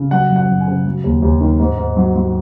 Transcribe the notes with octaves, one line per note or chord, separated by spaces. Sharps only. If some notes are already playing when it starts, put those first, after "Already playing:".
Already playing: C#3
F#3 F#5
F#2
F#5
F#2
G#5
C#3
F#3
D#2
D#2
D#3
G#2
G#2
F#3
F#3